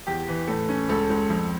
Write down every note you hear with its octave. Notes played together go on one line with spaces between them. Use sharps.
E2 G4
E3
A2 A4
C#4
C#2 A4
C#2
F2